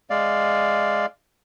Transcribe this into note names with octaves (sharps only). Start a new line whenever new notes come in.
G#3 D5 F5